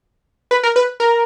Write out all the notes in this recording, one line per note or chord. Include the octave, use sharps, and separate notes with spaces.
B4
A#4
B4
A#4